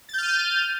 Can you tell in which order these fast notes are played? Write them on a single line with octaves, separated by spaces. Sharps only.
A6 G6 F6 D#7